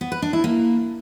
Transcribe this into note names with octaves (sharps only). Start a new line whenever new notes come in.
B3
B4
D4
E4
A#3